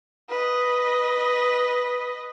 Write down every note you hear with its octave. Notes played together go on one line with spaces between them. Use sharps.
B4 D#5